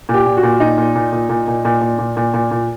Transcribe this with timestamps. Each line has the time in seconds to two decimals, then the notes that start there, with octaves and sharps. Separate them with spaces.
0.09 A#2
0.14 G4
0.26 A#2
0.37 F#4
0.43 A#2
0.60 A#2 D#4
0.78 A#2
0.95 A#2
1.12 A#2
1.29 A#2
1.48 A#2
1.65 A#2
1.81 A#2
1.98 A#2
2.17 A#2
2.34 A#2
2.51 A#2